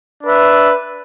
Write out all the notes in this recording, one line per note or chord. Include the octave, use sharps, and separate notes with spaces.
D4 B4 E5